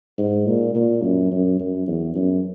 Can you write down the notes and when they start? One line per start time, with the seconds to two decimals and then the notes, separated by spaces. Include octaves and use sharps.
0.18 G#2
0.47 A#2
0.75 A#2
1.02 F#2
1.32 F#2
1.59 F#2
1.88 E2
2.15 F#2